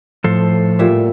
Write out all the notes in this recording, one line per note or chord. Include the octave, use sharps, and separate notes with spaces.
A2 F3 A4 C5
A#2 G3 E5